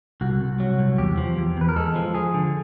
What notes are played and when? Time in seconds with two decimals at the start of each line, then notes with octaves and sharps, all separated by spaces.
0.21 C2 F#4
0.41 C2
0.60 F#3 F#4
0.79 C2
0.98 E2 G4
1.18 F3
1.38 E2
1.57 E2 B4
1.69 A#4
1.76 G#3 A4
1.96 F3
2.15 F3 G#4
2.34 D3